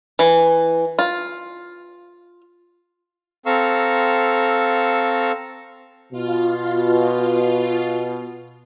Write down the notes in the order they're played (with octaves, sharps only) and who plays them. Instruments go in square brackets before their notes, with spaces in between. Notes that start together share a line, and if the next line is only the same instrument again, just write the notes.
[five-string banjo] E3
F4
[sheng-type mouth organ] C4 A4 F5 A#5 C#6 E6
[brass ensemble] B2 [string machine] F4